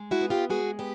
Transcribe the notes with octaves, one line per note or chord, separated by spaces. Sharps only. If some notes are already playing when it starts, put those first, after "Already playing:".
Already playing: G#3
E4 F#4
B3
F4 G4
G#3 F#4 G#4
B3 G4